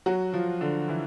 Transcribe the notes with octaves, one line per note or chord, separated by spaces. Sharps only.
F#3 F#4
F3 F4
D3 D4
E3 E4